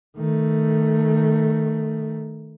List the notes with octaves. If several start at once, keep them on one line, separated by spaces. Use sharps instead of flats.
D#3 A3